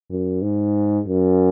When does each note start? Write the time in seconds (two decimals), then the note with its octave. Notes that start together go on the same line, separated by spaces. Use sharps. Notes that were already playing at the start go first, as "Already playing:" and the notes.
0.10 F#2
0.42 G#2
1.08 F#2